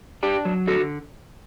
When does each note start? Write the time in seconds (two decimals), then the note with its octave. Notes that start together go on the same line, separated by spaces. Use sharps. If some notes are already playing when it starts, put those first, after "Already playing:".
0.23 D4 G4
0.45 F#3
0.67 D3 F#4 A4